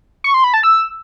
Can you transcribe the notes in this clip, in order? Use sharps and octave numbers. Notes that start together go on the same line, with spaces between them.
C#6
C6
B5
A5
E6